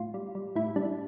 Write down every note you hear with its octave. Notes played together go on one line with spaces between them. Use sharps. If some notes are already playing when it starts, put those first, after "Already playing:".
Already playing: A2 F4
G3
G3
A2 E4
G3 D4